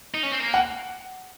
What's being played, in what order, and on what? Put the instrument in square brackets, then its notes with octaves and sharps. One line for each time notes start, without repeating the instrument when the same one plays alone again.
[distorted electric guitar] D#4
C#4
C4
A#3
[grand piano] F#5